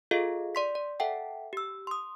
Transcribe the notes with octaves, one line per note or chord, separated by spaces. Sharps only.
F4 G#4 A4 D#5 F5
D5 C6 B6
D5
A4 E5 F#5 G5 A5
G4 E6
C6 D#6